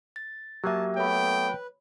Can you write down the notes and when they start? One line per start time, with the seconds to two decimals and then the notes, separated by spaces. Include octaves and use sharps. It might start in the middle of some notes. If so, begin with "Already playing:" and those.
0.16 A6
0.64 F#3 A#3 G4 E5 G#5 A5
0.97 A3 B3 C#5 G5 B5
1.48 B4